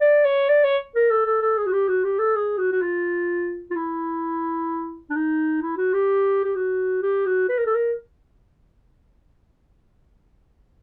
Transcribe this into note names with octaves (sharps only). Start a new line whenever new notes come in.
D5
C#5
D5
C#5
A#4
A4
A4
A4
G#4
F#4
G4
F#4
G4
A4
G#4
F#4
F#4
F4
F4
E4
D4
D#4
E4
F#4
G4
G4
F#4
G4
F#4
B4
A#4
A4
A#4